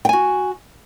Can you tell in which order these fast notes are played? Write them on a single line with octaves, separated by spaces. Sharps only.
G5 G#5 F#4